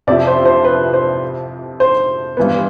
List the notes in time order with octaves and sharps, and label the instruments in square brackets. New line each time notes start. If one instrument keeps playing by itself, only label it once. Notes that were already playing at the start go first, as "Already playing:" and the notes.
[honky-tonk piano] F2 C3 F3 C4 E4 [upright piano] D5
[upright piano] C5
C5
B4
C5
C5
[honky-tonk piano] G2 E3 B3